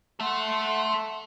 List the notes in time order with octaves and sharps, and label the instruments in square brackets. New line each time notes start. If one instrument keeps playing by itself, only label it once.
[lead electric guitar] A4 E5 [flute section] F#5 C6